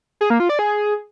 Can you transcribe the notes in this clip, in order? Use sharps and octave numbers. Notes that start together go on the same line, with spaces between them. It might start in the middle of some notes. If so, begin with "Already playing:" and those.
G#4
A#3
F4
D5
G#4